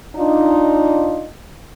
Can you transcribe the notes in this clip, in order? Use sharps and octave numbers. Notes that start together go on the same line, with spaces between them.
D4 D#4 F4